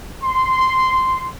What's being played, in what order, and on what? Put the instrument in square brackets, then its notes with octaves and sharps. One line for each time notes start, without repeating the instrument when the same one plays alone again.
[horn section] C6